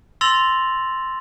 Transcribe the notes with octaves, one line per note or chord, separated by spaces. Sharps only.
C6 E6 A6 A#6 F7 F#7